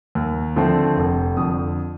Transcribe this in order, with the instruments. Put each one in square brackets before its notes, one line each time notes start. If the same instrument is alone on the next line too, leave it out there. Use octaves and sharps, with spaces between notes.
[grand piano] D#2
D3 F3 A3 C4
F1
F2 D3 D#6